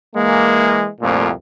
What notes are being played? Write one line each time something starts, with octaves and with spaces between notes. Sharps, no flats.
E3 G#3 A#3
C2 F2 A#2 A3